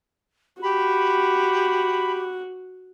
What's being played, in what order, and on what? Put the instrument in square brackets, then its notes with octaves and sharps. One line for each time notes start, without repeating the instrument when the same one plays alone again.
[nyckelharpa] F#4 [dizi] G4 [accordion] B5